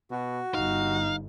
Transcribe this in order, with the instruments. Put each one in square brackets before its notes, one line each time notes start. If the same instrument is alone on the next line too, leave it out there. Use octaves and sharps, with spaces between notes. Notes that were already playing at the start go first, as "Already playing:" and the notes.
[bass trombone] B2 [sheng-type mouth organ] F#4
[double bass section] G1 [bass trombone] D#4 [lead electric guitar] F5